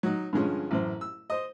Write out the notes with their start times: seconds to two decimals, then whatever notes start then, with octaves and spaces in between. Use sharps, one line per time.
0.03 F#3 D#4
0.33 G2 D3 F3 G#3 C#4
0.71 A1 F#2 C5
1.01 E6
1.30 C5 D#5